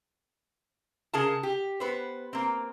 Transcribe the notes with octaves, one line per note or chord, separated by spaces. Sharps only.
C#3 G#4 A#4 G#5 A5
G4
B3 B4 C5
A#3 C4